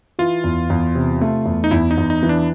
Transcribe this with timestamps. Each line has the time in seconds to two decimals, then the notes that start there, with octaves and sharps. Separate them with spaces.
0.19 E3 F4
0.44 E2
0.70 E2
0.95 C3
1.21 A3
1.46 E2
1.64 D#4
1.71 E2 E4
1.91 D#4
1.98 E2
2.10 D#4
2.23 E3
2.29 D4